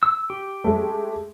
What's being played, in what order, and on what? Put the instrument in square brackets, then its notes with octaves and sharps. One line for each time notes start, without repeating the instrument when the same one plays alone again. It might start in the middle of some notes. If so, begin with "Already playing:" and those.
[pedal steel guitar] E6
G4
[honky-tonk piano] G#3 A3